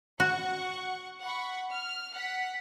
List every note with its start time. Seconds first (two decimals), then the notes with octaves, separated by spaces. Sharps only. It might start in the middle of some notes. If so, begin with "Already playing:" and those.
0.20 F#4 F#5 C#6
1.23 F#5 B5 C#6
1.70 F6
2.15 F#5 B6